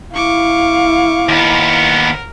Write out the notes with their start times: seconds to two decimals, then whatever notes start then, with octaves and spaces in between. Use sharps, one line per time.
0.15 E4 F5 C#6 D6
1.29 D#2 B3 A#4